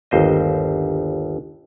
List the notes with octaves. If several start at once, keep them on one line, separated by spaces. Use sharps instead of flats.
G1 D#2 C5 D#5